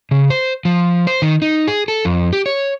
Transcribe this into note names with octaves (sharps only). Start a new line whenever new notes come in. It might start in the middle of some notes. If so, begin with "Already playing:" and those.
C#3
C5
F3
C5
D#3
D#4
G#4
A4
F2
G4
C#5